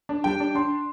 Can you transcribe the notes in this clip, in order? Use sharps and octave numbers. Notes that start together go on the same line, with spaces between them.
D4
G3 G5
D4
D4 C6